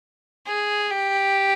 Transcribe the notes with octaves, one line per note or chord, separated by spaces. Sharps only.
G#4
G4